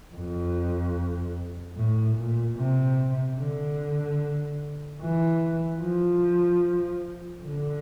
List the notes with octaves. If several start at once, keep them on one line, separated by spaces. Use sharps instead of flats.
F2
A2
A#2
C3
D3
E3
F3
D3